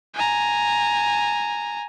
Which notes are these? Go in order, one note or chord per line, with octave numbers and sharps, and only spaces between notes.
G#5 A#5